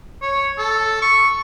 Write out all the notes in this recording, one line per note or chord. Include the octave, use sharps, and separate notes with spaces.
C#5
A4
C#6